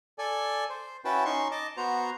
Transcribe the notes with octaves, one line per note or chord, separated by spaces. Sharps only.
A4 D5 G#5
C5
C#4 E4 F#4 B4 G5 A5
C#4 D#4 C6 C#6
D#5 A5 D6
B3 F#4 C5 A#5